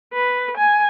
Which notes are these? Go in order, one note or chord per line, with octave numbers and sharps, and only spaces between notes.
B4
G#5